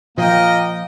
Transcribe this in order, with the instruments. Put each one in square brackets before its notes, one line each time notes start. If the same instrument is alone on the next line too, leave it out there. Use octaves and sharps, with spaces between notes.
[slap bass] A#2 F3 [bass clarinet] A#3 [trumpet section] A#4 D#5 G5